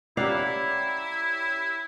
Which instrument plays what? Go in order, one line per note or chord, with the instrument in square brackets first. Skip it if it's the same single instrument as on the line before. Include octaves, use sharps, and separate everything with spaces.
[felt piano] C#4 G4 A#5 [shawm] E4 [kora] D5 F5 F#5